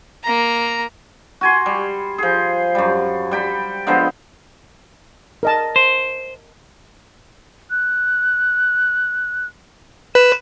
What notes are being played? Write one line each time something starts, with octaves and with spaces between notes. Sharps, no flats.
A#3 A#5
F#4 G#5 C6
G3
F3 G#4
F#2 G3
G3 G5 B5
D3 F3 G#3 B3
A#4 D#5 A5
C5
F#6
B4 E7